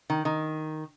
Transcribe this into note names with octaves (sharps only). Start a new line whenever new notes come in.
D#3
D#3